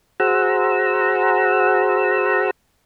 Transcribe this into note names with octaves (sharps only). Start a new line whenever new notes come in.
F#4 G#4 C5 F#5 A#5 E6